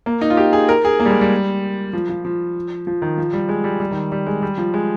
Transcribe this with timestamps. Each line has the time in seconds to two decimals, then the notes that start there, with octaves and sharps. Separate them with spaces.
0.06 A#3
0.21 D#4
0.30 F4
0.37 G4
0.53 G#4
0.69 A#4
0.85 G#4
1.00 A#3
1.05 G3
1.11 G#3
1.21 G3
1.93 F3
2.09 F3
2.25 F3
2.87 F3
3.02 D#3
3.18 F3
3.33 G3
3.49 G#3
3.64 G3
3.80 G3
3.91 D#3
4.12 G3
4.26 G#3
4.42 G3
4.58 F3
4.74 G#3